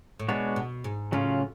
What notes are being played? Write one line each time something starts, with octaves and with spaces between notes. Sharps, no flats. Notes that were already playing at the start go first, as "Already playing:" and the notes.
A2
B2 G#3 B3 D4 F#4 C#5
B2
G#2
A2 C#3 F#3 C#4 F4